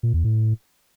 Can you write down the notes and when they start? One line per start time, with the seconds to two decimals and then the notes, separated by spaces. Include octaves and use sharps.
0.03 A#2
0.14 E2
0.24 A2